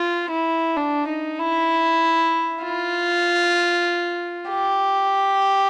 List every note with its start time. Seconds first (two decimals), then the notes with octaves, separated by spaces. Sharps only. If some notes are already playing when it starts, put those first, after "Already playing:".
Already playing: F4
0.30 E4
0.77 D4
1.07 D#4
1.39 E4
2.63 F4
4.50 G4